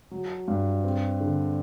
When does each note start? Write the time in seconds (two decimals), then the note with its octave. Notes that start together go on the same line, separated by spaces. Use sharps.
0.11 F#3
0.48 G2
0.84 C4
1.21 D3